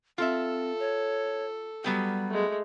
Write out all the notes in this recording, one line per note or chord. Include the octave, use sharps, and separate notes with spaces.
C4 F4 A4 E5
C#5
F#3 G3 B3 G4
G#3 A3